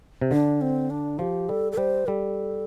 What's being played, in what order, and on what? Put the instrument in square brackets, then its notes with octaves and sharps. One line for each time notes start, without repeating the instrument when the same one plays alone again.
[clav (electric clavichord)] C3
[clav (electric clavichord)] D3 [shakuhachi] D4
[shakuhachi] C4
D4
[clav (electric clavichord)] F3 [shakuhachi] G4
[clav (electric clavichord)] G3 [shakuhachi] A4
[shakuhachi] A4
[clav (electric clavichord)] G3 [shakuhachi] C5
[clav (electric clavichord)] G3 [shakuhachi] A4